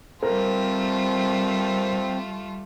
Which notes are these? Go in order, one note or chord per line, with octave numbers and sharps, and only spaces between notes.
G3 A3 C4 F4 A#4